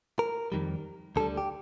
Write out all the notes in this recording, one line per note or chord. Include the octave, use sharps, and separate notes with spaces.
A#4
F2 D#3 G3
D2 D3 G3 A4
G4